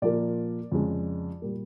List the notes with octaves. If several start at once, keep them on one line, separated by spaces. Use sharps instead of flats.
A#2 F3 A#3 D5
F2 C#3 F3 G#3
A#2 G3 A#3